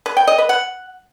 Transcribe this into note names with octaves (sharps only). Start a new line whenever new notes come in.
B4
G5
D#5
B4
F#5